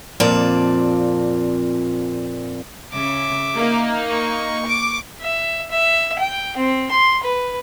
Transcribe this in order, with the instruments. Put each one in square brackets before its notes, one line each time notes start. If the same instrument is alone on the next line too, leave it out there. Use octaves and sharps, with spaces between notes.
[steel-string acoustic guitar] F2 A#2 C4 D5 A5
[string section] C#3 [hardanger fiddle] E5 D6
[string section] A#3 D#4
[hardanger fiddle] C#6
[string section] D6
[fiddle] E5
E5
G5
C4
C6
B4